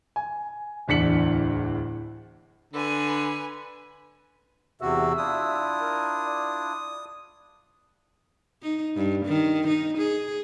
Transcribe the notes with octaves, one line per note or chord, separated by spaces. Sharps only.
G#5
D1 E2 D4 B6 C#7 F#7
D3 B4 G#5
E2 C3 F#4 E5
D4 E4 F4 D#6
A#4
D5
D#4
G2
D#3
D#4
G#4